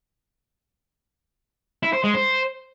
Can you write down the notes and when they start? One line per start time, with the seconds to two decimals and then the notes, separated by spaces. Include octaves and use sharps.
1.83 E4
1.93 C5
2.04 G#3
2.14 C5